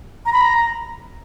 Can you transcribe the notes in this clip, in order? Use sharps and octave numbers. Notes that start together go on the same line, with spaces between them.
A#5
B5
A#5